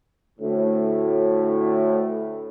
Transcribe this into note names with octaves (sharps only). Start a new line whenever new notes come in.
D2 A2